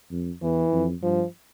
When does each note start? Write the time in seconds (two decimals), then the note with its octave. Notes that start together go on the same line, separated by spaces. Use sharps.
0.11 F2
0.43 E2 E3
0.72 F2
1.02 G2 F3